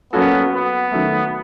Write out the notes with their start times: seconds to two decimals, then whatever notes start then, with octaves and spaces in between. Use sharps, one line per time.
0.13 F#3 A#3 B3 C#4 F#4 A4
0.53 B3
0.92 D#3 F#3 A3